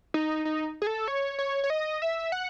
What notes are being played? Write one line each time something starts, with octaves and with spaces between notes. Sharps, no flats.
D#4
D#4
G#4
A4
C#5
C#5
C#5
D#5
E5
F#5